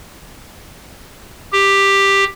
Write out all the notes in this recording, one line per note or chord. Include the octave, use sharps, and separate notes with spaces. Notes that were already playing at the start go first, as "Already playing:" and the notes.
G4